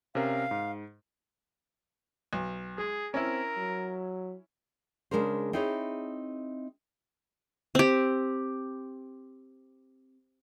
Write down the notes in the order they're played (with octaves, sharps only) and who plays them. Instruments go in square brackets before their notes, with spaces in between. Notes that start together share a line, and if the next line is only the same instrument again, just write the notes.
[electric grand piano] C3 C#4 A#4 [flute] F5
[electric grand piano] G#2
[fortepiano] B1
[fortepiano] G#3 [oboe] G#4
[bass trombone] C4 [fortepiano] C#4 E4 [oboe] A#4
[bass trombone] F#3
[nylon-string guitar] C#3 E3 G#3 D4 A#4 C5
C4 D#4 E4 G#4 C#5
[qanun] C4 G4